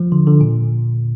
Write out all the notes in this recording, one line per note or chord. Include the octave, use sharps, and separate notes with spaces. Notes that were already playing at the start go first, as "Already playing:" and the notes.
Already playing: F3
D3
D3
A#2